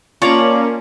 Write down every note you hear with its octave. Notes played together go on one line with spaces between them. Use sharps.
A#3 C#4 F4 C#5 D5 F5 A5 A#5